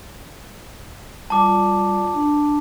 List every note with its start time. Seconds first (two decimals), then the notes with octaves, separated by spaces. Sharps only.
1.30 G3 F4 D5 A5 D6
2.14 D4